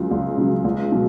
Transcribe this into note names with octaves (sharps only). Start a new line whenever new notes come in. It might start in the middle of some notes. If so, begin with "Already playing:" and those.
Already playing: C#2 C#3 F#3
C#2
C#3 F#3
C#2
B2 F#3